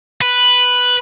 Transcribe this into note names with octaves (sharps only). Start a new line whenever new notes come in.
B4